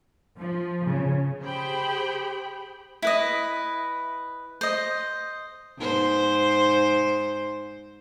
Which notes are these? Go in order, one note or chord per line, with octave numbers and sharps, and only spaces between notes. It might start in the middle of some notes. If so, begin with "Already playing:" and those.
F3
C#3
G4 G#4 C5 G5 B5
E4 B4 D#5
C5 D#5
G#2 C5